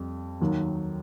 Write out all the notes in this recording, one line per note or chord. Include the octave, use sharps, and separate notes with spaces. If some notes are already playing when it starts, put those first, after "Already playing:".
Already playing: F2 G3
D#2 D#3 F#3